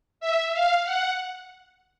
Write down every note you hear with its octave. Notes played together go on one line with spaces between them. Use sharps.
E5
F5
F#5